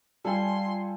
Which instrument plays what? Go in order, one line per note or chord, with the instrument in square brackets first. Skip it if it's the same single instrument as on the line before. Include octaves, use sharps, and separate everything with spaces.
[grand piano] G3 [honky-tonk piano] F4 G#5 [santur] A4 [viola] C6